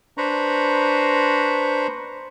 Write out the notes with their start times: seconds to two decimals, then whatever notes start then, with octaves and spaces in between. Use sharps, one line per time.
0.18 D4 B4 C5 A#5 B5 C#6